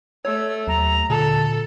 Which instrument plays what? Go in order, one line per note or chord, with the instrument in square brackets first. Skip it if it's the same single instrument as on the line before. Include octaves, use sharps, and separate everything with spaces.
[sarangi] A3 [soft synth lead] C#5 [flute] E6
[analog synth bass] D#2 [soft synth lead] F#3 [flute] A#5
[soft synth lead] A#2 [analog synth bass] D3 [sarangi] A4 [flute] A5